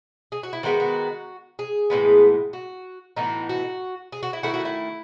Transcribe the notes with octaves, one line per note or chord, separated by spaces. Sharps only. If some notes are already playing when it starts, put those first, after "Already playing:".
G#4
F#4
E4
D#3 G#3 B3 F#4
F#4
G#4
A2 E3 G#3 B3
F#4
A2 E3 B3 D#4 F#4
F#4
G#4
F#4
E4
D#3 A3 E4 F#4
F#4
E4